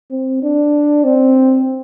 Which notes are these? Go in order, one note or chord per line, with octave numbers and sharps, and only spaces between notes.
C4
D4
C4